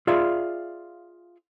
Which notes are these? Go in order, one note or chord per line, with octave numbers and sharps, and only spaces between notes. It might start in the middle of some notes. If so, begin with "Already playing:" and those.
F4 G#4 D5 E5 F5